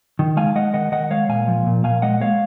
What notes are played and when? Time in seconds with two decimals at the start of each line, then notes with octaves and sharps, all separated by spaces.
0.19 D#3
0.37 G#3 F5 G#5
0.55 G#3 D#5 F#5
0.74 D#3 D#5 F#5
0.92 D#3 D#5 F#5
1.11 G#3 C#5 F5
1.29 A#2 F5 G#5
1.48 F3
1.66 A#2
1.84 A#2 F5 G#5
2.02 G#3 D#5 F#5
2.21 G#3 C#5 F5